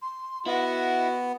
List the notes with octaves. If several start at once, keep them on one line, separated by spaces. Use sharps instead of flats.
C6
B3 E4 F#4 D#5